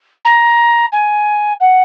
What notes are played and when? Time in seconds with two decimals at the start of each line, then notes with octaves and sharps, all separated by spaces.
0.25 A#5
0.92 G#5
1.60 F#5